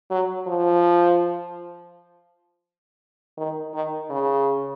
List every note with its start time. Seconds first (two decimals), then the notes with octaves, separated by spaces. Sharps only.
0.11 F#3
0.47 F3
3.38 D#3
3.75 D#3
4.10 C#3